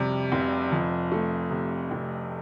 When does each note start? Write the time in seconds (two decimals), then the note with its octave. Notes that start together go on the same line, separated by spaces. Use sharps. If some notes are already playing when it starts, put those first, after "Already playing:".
Already playing: F2 C3 G3
0.32 F1
0.72 F2
1.12 A3
1.51 C3
1.91 F1